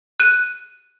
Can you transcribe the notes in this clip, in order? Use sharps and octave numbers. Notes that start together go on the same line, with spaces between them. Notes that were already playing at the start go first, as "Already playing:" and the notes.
F#6 D#7